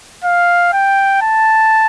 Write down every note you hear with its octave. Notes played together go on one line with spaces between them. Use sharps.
F5
G5
A5